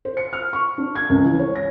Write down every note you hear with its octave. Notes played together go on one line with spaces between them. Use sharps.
C5
C#7
F6
C#6
D4
G#6
C#2
E3
C#5
A#6